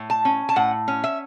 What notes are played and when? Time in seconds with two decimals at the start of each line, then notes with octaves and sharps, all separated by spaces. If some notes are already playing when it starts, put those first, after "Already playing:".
Already playing: A2
0.10 A5
0.25 C#4
0.49 A5
0.56 A2 F#5
0.88 C#4
1.04 E5